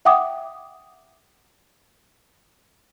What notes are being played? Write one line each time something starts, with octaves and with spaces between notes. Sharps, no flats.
E5 F#5 G5 D6 D#6